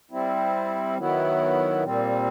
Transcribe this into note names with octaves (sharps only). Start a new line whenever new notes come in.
G3 C4 E4
D#3 F#3 B3 E4
A#2 G3 C4